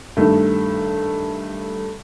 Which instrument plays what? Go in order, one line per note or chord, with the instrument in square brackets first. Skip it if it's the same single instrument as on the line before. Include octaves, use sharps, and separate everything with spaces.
[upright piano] G2 D#3 A3